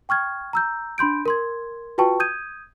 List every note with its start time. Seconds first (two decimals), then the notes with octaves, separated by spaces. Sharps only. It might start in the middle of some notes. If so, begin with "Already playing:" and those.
0.09 G5 C#6 F6 G#6
0.53 A#5 E6 G6
0.98 D4 B5 C6 G6 D7
1.26 A#4 C6 G#6
1.98 F4 F#4 B4 G5 A5 C#6
2.20 D#6 G6 G#6 D#7